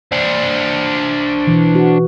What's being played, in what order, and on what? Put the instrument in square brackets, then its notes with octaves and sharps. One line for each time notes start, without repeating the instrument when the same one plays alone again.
[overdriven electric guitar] D4 C5
[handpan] B2 E3
F#4